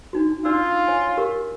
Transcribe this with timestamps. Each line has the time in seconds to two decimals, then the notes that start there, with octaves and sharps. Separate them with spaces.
0.13 D4 D#4 F#4
0.45 D4 F4 D5 E6
0.87 C#5 G#5
1.17 G4 A#4 F5